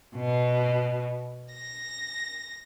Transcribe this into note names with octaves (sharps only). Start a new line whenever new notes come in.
B2
A#6